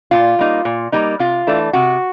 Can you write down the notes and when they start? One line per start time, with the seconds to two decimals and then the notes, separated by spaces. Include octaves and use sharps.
0.11 A#2 F4
0.39 G3 A#3 D#4
0.65 A#2
0.92 G3 A#3 D#4
1.19 C3 F4
1.47 E3 A3 D4
1.73 C3 F#4